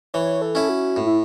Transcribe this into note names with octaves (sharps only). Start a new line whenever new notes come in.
E3 C#5
A4
C#4 E4
F#4
A2
E4